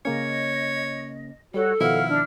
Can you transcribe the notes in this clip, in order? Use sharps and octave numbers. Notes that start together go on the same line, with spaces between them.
C#3 A#3 C#4 C#5 D#5
G3 F#4 A4 C#5
B2 D#3 F3 E4 F5 F#5 F6
D4 F6